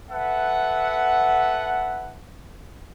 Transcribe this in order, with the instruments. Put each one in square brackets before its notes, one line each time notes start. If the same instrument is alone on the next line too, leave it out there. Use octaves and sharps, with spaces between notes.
[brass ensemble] A4 B4 E5 F#5